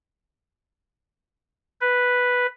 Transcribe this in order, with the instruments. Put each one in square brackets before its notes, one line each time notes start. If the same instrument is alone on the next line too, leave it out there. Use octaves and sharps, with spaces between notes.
[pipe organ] B4